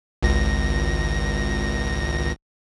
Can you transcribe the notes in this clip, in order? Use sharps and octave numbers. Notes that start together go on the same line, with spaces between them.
G#1 C#2 A#6